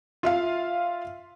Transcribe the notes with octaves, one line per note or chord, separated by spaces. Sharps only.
F4 E5 F5